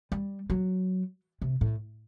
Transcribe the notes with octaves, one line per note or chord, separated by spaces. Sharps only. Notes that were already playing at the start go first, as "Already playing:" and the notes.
G3
F#3
C3
A2